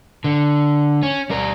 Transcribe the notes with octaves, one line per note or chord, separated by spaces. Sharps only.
D3
C#4
G3 A#4